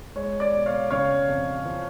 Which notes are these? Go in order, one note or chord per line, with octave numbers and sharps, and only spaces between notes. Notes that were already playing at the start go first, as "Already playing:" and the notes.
G#3 C#5
D5
B2
C#5 F5
C#3 C#5 F5
F2
F3